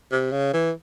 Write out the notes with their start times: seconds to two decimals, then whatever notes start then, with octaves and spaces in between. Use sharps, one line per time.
0.11 C3
0.32 C#3
0.54 E3